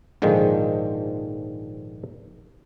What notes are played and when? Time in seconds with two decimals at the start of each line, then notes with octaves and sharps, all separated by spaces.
0.22 A#1 G#2 D3 D#3 F3 G#3